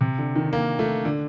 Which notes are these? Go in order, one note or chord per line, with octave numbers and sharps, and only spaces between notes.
C3
D3
D#3
A#3
A3
D3